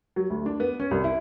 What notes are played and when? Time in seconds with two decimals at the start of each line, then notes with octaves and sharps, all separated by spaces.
0.16 F#3
0.30 D2
0.46 D4
0.60 B3
0.80 C#4
0.91 C2
1.04 E4